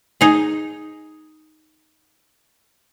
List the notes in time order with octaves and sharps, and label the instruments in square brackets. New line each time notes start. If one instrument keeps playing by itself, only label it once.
[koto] D#4 G#4